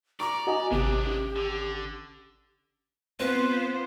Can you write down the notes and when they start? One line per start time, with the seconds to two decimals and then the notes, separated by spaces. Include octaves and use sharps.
0.20 D5 A#5 C#6 D6
0.47 F#4 D#5 G#5
0.71 G#1 C3 G#3 D4 G4
1.06 C#4
1.36 D3
3.20 B3 C4 F4 B4 C5